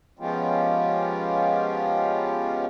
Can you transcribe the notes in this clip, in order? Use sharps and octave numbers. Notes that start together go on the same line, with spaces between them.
F3 G#3 B3 C#4 F4 G4